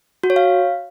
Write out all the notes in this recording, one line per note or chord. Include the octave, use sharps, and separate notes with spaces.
F#4
C#5
F5